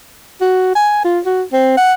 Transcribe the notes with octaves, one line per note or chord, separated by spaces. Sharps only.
F#4
G#5
F4
F#4
C4
F#5